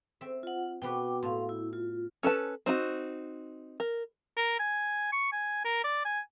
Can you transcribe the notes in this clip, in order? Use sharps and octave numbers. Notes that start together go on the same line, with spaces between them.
C4 E5
F4 F#5
B2 B3 B4 G5 D6
A2 F5 C6
E4
F4
C#4 A4 B4 A5
C4 D#4 E4 F#4
A#4
A#4
G#5
C#6
G#5
A#4
D5
G#5